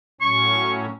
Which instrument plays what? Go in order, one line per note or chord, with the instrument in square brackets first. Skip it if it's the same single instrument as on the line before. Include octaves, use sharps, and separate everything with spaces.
[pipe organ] A2 F#3 C#4 [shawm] C#6